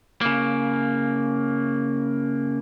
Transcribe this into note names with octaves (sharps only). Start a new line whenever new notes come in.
C#3 A#3